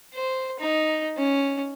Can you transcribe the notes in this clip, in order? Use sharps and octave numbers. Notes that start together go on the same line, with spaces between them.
C5
D#4
C#4